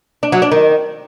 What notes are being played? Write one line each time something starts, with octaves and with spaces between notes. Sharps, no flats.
D4
F#3
D4
D#3